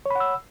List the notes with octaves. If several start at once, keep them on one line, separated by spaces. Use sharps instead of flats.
C#5 F#5 B5 E6